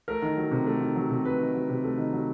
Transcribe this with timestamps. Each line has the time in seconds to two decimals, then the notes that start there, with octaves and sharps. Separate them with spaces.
0.08 A3 A#4
0.22 D#3
0.37 F#3
0.51 C3
0.66 A3
0.81 D#3
0.95 F#3
1.10 C3
1.24 A3 B4
1.39 D#3
1.54 F#3
1.69 C3
1.84 A3
1.98 D#3
2.13 F#3